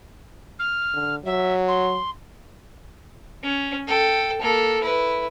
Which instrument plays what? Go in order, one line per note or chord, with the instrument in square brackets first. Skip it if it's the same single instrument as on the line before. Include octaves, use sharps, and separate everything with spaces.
[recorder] F6
[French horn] D3
[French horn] F#3 [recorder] E5
[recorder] C6
[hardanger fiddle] C#4
A4 G5
A#3 A4
E4 B4